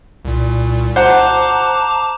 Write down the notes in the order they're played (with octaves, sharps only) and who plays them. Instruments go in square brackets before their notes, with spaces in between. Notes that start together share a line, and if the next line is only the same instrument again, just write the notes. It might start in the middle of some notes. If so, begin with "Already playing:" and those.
[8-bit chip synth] C2 A#2
[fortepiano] C5 F#5 [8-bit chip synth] A5 A#5 D6